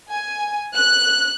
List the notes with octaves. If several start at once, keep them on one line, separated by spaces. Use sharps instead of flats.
G#5
F#6